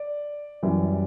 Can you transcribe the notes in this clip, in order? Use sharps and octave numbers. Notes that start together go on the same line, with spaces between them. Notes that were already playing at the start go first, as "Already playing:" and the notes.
Already playing: D5
F#2 E3 G3